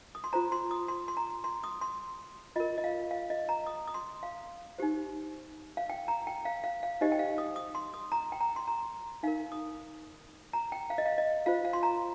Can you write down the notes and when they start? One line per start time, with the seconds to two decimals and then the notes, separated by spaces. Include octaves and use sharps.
0.15 D#6
0.24 C6
0.33 F4 C5 A#5
0.52 C6
0.71 D#6
0.88 C6
1.08 C6
1.17 A#5
1.44 C6
1.64 D#6
1.81 C6
2.56 F4 D#5
2.60 A#4
2.78 D#5
2.84 F5
3.11 F5
3.30 D#5
3.49 A#5
3.67 D#6
3.88 D#6
3.94 C6
4.23 F5
4.78 D#4 G4 C5
5.77 F5
5.90 G5
6.08 A#5
6.27 G5
6.45 F5
6.64 F5
6.83 F5
7.01 D#4 G4 C5 D#5
7.12 G5
7.19 F5
7.38 D#6
7.56 D#6
7.75 C6
7.94 D#6
8.12 A#5
8.32 G5
8.41 A#5
8.56 C6
8.67 A#5
9.23 D#4 F5
9.27 A#4
9.52 D#6
10.53 A#5
10.72 G5
10.90 F5
10.98 D#5
11.06 F5
11.18 D#5
11.46 F4 C5 F5
11.65 F5
11.73 C6
11.83 A#5